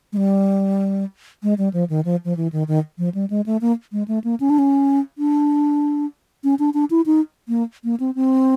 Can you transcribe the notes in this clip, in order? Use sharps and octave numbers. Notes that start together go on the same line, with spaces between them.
G#3
G3
G#3
G3
F3
D#3
F3
F3
E3
D#3
D#3
F3
G3
G#3
A3
A#3
G#3
A3
A#3
C#4
D4
C#4
D4
C#4
D4
D4
E4
D#4
A#3
A#3
C4
C4